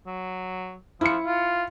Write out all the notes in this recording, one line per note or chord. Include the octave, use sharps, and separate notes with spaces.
F#3
F3 E4 C#7
F4